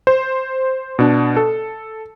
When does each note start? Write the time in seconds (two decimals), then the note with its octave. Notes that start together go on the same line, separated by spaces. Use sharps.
0.07 C5
0.99 B2 D4
1.37 A4